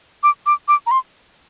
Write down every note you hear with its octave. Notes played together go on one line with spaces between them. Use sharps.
D6
D6
D6
A#5
C6